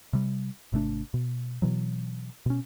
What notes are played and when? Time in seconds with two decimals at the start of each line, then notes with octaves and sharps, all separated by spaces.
0.13 C3 G3
0.72 G#1 C3 A3 D4
1.14 B2
1.62 B2 E3 F#3
2.46 B2 C#4